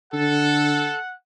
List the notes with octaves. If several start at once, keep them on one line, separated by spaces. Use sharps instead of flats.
D3 A4 F#5